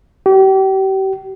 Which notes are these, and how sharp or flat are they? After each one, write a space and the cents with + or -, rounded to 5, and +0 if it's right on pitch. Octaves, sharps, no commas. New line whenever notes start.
G4 -35